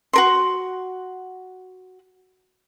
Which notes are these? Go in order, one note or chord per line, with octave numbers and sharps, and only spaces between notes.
F#4 A#4 C6